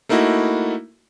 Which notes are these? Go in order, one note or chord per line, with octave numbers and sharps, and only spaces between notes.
A3 A#3 D#4 E4 F#4